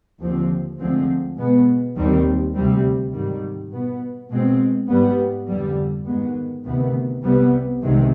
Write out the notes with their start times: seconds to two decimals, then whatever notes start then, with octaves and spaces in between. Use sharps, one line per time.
0.20 D#2 D3 F3 C4
0.79 D2 D3 F3 G#3 C4
1.37 B2 G#3 B3
1.96 D#2 D#3 G3 C4
2.54 D2 C3 G3 C4
3.13 G#2 D#3 G3
3.71 B2 B3
4.30 B2 G#3 C4
4.89 G#2 G3 B3
5.47 F2 D3 G3
6.05 G#2 D#3 G#3 B3
6.65 D2 C3 D#3 B3
7.23 C2 C3 G3 B3
7.81 C2 C3 D#3 G#3